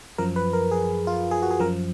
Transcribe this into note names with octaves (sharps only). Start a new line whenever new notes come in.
F#2 F3 A#4
B4
A#4
G#4
F4
G#4
F#4
G#4
F#2 F3 A#4